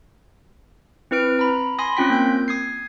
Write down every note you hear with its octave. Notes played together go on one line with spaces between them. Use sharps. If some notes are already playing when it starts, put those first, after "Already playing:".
C4 E4 B4 F6 D7
A#5 B5
G#5 B5 C6 D#6 A#6
C4 C#4 F4 G5 B6
A#3 G6
D#6 G#6 C7